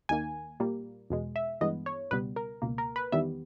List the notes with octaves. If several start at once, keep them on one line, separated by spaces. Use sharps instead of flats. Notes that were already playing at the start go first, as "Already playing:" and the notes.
D#2 D#3 A#3 G#5
A#2 G3 A#3
E2 B2 G#3
E5
G2 E3 G#3 B3 D#5
C#5
C#2 B2 G3 B3 B4
A#4
C#2 B2 A#3
A#4
B4
E2 D#3 G3 B3 E5